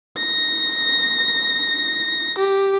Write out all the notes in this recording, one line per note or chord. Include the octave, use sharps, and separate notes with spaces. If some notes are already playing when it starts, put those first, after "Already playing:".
A#6
G4